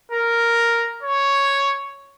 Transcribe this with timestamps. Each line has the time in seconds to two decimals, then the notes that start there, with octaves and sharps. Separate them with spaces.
0.12 A#4
1.03 C#5